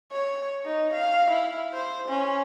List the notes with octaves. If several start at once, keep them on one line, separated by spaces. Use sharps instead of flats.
C#5
D#4
F5
E4
C5
C#4